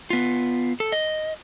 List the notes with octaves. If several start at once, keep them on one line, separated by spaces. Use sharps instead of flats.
B3 F4
A4
D#5